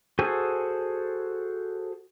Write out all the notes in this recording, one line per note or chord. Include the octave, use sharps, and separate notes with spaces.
F#4 G#4 A4 C5 G#5